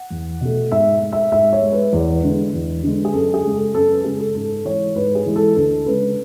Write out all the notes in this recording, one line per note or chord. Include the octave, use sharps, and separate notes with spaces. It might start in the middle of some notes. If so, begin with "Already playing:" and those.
Already playing: F#5
E2
B2 A3
G#2 E5
G#3
E5
G#2 E5
C#5
G#3
B4
E2
D3 G#3
E2
D3 G#3
G#4
F#2 A4
G#4
C#3 G#3
A4
F#2 A4
B4
C#3 G#3 G#4
A4
G#2 A4
E3 G#3 C#5
G#2 B4
G#4
E3 G#3
A4
D2 A4
C#3 G#3 B4